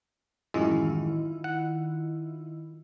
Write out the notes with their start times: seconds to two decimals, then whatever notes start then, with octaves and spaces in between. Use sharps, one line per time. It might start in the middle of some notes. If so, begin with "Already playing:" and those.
0.54 A1 F#2 D#3 G#3 E4 F4
1.44 F#5